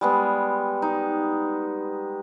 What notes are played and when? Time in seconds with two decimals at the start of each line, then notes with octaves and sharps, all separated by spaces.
0.01 G3 G#3 B3
0.82 D#4